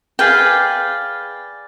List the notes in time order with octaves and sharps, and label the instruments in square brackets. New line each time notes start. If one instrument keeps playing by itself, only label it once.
[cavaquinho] G#4 B4 D5 F5 G5